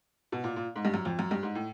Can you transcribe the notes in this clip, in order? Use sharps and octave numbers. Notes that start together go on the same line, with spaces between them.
B2
A#2
A#2
G#2
G2
F#2
F2
F#2
G2
G#2
A2